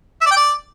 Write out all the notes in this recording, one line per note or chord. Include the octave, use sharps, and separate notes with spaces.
E5
D5
G5
D5